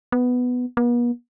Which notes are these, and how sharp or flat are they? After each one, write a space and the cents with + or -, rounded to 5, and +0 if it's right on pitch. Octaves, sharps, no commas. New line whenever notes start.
B3 +5
B3 -45